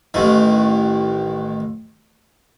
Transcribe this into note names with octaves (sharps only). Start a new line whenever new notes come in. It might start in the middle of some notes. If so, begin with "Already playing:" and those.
A1 D#3